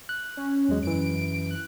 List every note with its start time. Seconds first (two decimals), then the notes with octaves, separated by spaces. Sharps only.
0.09 F#6
0.37 C#4
0.69 E2 F#3 G#3
0.83 F#2 E3 D7
1.51 F#6